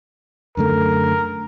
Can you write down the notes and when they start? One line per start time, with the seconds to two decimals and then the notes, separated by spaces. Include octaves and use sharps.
0.57 F#2 D3 A3 A#4